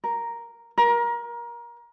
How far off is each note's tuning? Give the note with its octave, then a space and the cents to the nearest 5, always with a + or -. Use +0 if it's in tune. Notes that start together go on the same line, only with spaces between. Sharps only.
A#4 +0
A#4 +25